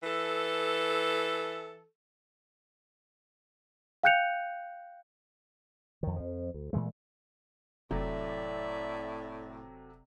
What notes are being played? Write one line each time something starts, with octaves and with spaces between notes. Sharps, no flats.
E3 A4
F5 G5 F#6 G6 C#7 F7
F2 D#3
F2 F3
D2
A#2 E3 G#3 A3
F1 A2 C3 F#3 A3 D5 E5